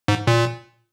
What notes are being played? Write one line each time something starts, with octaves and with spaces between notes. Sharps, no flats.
G#2
A#2